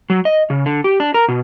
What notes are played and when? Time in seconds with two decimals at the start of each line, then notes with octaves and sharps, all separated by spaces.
0.10 F#3
0.25 D#5
0.50 C#3
0.66 D3
0.84 G4
1.00 D4
1.14 A#4
1.28 B2